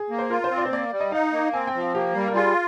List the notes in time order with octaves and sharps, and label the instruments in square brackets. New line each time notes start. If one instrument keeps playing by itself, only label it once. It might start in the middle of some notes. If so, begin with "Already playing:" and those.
Already playing: [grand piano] G#4
[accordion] A#3
[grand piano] C5
[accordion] F4 [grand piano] A#4
[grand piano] C5
[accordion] C4
[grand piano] D5
C5
[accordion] A#3 [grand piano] D5
[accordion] G3
[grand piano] D#5
[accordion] D#4 [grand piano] F5
[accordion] A#3
[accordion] C4 [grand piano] G#5
[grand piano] G5
[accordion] F3
[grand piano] F5
[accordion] A#3 [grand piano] G4
[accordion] G3
[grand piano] A#4
[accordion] F4 [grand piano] G#4